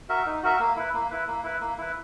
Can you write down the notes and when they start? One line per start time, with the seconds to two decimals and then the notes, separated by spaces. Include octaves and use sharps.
0.09 F#4 A#4 E5
0.26 D#4
0.43 F#4 A#4 E5
0.60 A#3
0.76 E4 B4
0.94 A#3
1.10 E4 B4
1.28 A#3
1.43 E4 B4
1.61 A#3
1.78 E4 B4